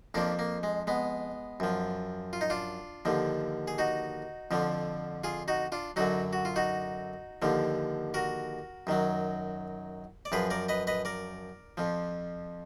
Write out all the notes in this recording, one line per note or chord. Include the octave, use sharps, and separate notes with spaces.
F2 F3 A#3 D4
A#3
G#3
G#3 B3
F#2 F3
F4
D#4
D4 F4
D#2 D3 F3
G#4
D#4 F#4
F2 D3 F3
F4 G#4
D#4 F#4
D4 F4
F#2 D3 F#3 D#4 F#4
F#4
F4
D#4 F#4
D#2 D3 F3
F#4 A#4
F#2 D#3 F#3
D5
F#2 F3 G#4 B4
A#4 D5
B4 D#5
B4 D#5
A#4 D5
F2 F3